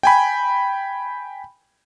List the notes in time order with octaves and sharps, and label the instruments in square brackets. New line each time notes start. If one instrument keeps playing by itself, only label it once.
[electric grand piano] G5 G#5 B5